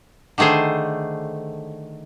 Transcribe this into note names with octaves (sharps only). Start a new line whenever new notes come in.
D3 D#3 A3 G#4 C5